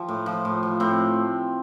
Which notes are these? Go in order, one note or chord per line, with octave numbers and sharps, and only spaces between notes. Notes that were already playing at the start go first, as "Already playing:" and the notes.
Already playing: F3 G4
A2
F3
A2
F3
A2 C4